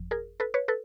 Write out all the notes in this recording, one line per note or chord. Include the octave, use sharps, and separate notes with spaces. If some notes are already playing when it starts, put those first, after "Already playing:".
Already playing: G1 F2 F3
G#4 A#4
A4 B4
B4 C#5
A4 B4